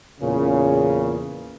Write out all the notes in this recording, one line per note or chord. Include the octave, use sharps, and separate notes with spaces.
E2 A#2 C#3